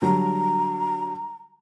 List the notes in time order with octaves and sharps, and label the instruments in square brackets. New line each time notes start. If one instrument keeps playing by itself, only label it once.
[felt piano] D3 F#3 G3 [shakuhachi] A#5